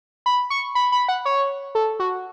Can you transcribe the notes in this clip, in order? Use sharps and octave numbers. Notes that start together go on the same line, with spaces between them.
B5
C#6
B5
B5
F#5
C#5
A4
F#4